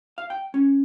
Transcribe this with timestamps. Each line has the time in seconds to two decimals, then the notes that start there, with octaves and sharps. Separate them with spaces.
0.18 F5
0.30 G5
0.54 C#4